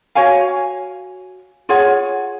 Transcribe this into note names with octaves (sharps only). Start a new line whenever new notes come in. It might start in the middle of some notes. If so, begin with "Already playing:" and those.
F#4 C#5 F5 G#5
F4 G#4 C#5 F#5